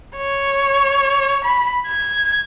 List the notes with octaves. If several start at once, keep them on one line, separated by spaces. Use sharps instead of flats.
C#5
B5
G#6